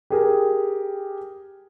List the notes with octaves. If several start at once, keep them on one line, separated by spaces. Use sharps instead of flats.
G4 G#4 A#4